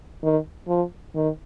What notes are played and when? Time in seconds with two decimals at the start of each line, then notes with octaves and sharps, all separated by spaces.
0.23 D#3
0.68 F3
1.15 D#3